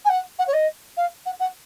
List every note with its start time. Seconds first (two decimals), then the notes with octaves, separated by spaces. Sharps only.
0.05 G#5
0.09 F#5
0.38 F#5
0.47 C#5
0.53 D#5
0.97 F5
1.25 F#5
1.39 F#5